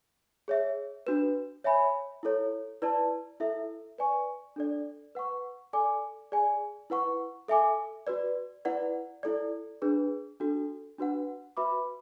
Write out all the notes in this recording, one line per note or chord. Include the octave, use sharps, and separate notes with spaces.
G#4 C#5 E5
D4 F#4 B4
C#5 E5 G#5 B5
E4 A4 C#5
E4 B4 D5 A5
E4 A4 E5
B4 D5 G#5 C#6
D4 A4 D5
B4 F#5 C#6
A4 D5 G#5 D6
G#4 D5 G#5
E4 B4 F#5 C#6
A4 E5 G#5 D6
F#4 B4 D5
E4 B4 D5 F#5
E4 A4 D5
D4 G#4 B4
D4 F#4 A4
D4 F#4 B4 F#5
F#4 B4 E5 B5 D6